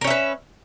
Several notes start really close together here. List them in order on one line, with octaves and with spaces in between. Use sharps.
A#4 C#4 E5 B4